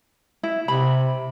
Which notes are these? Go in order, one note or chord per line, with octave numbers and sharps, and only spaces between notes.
E4
C3 B5